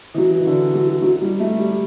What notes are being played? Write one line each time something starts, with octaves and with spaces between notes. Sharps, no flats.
E3
F#3
E3
D3
F#3
F#3
G3
A3
G3